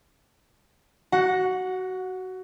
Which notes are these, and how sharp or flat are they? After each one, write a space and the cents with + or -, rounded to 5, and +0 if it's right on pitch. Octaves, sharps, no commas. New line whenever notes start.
F#4 +15 F#5 -15